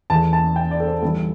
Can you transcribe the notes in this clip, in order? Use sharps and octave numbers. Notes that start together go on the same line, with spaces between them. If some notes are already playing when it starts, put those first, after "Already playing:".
E2 E3 A3 A5
A5
G5
D5
A4
C5
G1 G2 E3 A3 A4